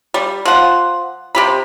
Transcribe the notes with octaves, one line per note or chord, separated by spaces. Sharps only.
G3
F3 F#5
C3 G4 B5